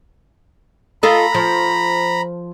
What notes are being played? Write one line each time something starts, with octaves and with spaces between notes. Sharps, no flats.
F4 A4 D#5 A#5 B5
F3